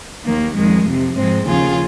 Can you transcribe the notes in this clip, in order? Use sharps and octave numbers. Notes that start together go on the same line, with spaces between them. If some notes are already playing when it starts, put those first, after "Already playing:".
D#2 D#3 A#3
F2 D#3 G#3
F2 C3 F3
G#2 F3 G#3 C4
D#2 C#3 F3 F4 G#4